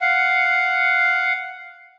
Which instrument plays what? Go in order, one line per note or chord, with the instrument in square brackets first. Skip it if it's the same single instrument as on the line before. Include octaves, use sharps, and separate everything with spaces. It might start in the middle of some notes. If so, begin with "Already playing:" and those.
[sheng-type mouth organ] F5 F#5